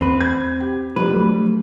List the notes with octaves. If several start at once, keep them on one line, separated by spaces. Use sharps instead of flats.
E2 C4 B4
G#6
G4
F3 G3 D4 B4
F#3 A3